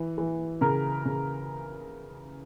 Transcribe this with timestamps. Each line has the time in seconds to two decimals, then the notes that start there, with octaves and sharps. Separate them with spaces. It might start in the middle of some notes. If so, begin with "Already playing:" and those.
Already playing: E3
0.18 E3
0.61 C#3 A#4
1.05 C#3